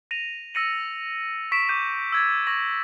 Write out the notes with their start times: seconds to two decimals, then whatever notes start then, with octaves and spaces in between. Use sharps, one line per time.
0.11 A#6 D#7 F7
0.54 E6 A6 A#6 C#7 D#7 F#7
1.52 C#6 B6 D7 E7
1.69 C#6 D6 G6 B6 D#7
2.12 E6 G#6 A6
2.47 C#6 G#6 A#6 F#7